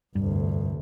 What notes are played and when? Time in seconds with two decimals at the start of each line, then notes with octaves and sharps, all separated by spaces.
0.15 F1 D2 G2